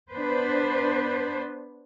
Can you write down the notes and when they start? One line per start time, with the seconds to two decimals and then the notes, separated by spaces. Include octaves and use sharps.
0.12 B3 D4 B4 C5